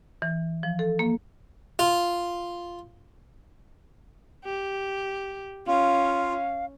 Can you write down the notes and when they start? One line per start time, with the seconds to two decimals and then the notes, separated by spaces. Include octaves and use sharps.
0.22 E3
0.63 F3
0.79 A4
0.99 A#3
1.79 F4
4.44 G4
5.67 C#4 F4 F5